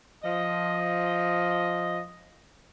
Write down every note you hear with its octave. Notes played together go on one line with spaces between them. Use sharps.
F3 D#5